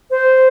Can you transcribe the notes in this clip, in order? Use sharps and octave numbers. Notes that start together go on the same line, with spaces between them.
C5